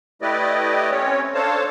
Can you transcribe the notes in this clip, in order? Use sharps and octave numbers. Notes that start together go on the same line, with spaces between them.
A3 E4 G4 B4 D5 D#5
C4 C#4 C#5
D4 A4 C5 C#5 F5 A5